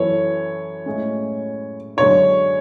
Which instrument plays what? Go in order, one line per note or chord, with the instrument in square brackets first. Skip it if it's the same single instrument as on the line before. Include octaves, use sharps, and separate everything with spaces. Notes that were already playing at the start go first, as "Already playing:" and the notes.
Already playing: [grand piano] F#2 E3 B3 E4 A4 [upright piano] C#5
[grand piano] A2 G#3 C#4
[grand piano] F#2 D3 G#3 B3 D4 [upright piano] C#5